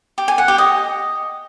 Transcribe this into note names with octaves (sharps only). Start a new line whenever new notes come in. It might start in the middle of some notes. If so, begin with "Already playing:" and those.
G4
G#5
F#5
G4
D#5